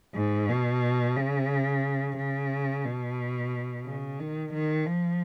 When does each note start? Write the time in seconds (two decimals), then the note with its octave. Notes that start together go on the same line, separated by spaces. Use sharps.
0.15 G#2
0.49 B2
1.17 C#3
2.17 C#3
2.85 B2
3.85 C#3
4.20 D#3
4.54 D#3
4.86 F3